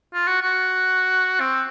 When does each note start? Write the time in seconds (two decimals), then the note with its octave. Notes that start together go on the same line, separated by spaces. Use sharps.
0.14 F4
0.27 F#4
0.42 F#4
1.40 C4